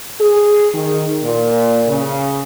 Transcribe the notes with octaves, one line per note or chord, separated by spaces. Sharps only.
G#4
D#3
A#2
C#3